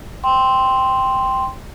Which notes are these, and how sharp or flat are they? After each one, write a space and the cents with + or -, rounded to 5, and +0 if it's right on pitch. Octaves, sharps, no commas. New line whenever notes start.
G5 +0 C6 +0